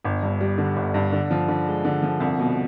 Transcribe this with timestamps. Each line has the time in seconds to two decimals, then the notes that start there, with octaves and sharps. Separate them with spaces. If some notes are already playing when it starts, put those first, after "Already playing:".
0.05 G1
0.23 G2
0.41 G3
0.58 D3
0.76 G1
0.94 G2
1.13 D3
1.31 F3
1.48 D3
1.67 G#3
1.85 D3
2.02 F3
2.20 C2
2.39 B2